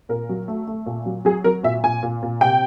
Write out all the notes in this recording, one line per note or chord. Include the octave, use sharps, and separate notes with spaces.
A#2 A#4
F#3
A3
A3
A#2
F#3
F#3 G#4
F#3 A#4
A#2 E5
A#2 G#5
A#2
A#2
C3 G5